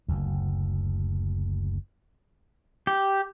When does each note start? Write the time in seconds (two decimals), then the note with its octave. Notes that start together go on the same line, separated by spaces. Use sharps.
0.08 F#1 D2
2.87 G4